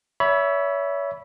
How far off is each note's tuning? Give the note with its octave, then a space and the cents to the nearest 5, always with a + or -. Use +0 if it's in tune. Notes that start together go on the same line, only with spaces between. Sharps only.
C#5 +30 E5 +5 B5 -10